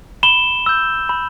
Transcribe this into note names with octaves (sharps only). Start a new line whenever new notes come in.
B5 E7 G7
E6 G6
B5